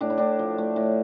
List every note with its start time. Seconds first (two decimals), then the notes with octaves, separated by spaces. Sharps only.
0.01 A2 D4
0.10 E4
0.18 A2 D4
0.39 F3
0.58 A3
0.76 A2